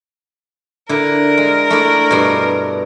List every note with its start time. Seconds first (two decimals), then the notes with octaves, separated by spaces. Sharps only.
0.89 D3 E4 A#4
1.38 G#3
1.70 A3 D4 E4
2.11 G2 B2